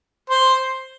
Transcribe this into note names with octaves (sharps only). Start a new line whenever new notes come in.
C5